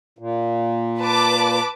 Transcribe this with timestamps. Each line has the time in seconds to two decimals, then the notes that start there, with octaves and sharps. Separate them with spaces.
0.19 A#2
0.99 B4 A5 D6